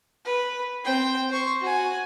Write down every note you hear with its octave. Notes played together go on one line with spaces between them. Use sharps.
B4
C4 G5
C5 C#6
F#4 G#5